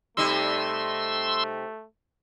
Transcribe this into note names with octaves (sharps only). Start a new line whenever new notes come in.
C3 G3 A3 D#4 C6 E6